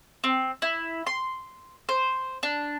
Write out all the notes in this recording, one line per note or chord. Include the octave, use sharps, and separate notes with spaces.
C4
E4
C6
C5
D4